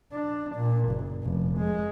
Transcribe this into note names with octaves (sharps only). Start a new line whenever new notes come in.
D4
A#2
F#1
F1
G#3